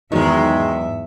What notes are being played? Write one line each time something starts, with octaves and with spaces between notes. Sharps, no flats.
E2 G#2 D#3 F#3 G#3 D#4 E5